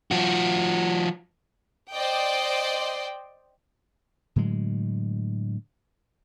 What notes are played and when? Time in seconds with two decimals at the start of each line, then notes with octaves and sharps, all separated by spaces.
0.11 F3 F#4
1.93 C5 D5 D#5 G5
4.36 A2 D3 F#3 G#3